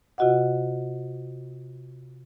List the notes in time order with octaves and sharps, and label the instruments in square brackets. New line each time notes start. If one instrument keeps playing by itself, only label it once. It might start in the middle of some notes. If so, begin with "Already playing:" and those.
[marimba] C3 F4 F#4 D#5 F#5